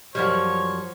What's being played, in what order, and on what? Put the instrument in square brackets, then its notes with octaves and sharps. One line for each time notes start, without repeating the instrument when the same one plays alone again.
[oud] F#2 F3 G3 [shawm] C#5